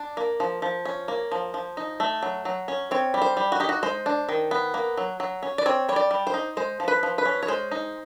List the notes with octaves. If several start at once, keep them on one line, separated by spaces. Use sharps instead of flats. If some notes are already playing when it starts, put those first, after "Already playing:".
Already playing: D4
A#3
F3
F3
C#4
A#3
F3
F3
D#4
A3
F#3
F#3
C#4
C4 C#5
G3
C5
G3
F#4
D#4 G4
F#4
G#3 C5
D4
D#3
B3
A#3
F#3
F#3
C#4
D5
C4 C#5
G3 C#5
D5
G3
C5
D#4
G#3 C5
F3
B4
F3
B4
C#4
C#5
G#3 C5
D#4